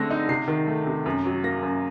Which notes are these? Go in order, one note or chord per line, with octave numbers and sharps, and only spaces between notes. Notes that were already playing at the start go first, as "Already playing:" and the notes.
Already playing: D3 A3 C4 A#6
D#4
C3 C7
D#3
A3
C3
F#2
F#3
A#3 A#6
F#2